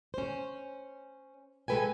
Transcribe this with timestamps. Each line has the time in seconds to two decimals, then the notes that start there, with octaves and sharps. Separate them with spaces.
0.14 C#4 C5
1.68 G#3 A4 B4 G5 G#5